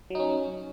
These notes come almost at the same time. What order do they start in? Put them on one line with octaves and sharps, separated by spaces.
F#3 D#4 C#4